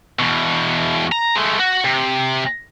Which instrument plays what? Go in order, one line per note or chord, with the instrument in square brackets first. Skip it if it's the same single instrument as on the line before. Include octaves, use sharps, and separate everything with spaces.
[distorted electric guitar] E2 B2
A#5
G#3 A3
F#4
C3